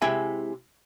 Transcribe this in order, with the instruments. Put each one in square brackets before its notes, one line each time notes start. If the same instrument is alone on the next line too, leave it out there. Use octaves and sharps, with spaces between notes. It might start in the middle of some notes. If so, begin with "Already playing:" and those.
[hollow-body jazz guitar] C3 G#3 E4 E5 G5 G#5